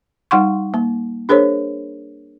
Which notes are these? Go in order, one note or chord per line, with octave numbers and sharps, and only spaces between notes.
G3 D#4 F#5 C6 C#6
A#3
D4 G#4 A#4 C5 C#5